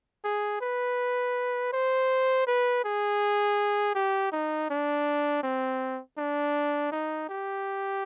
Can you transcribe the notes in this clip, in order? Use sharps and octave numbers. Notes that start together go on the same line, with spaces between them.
G#4
B4
C5
B4
G#4
G4
D#4
D4
C4
D4
D#4
G4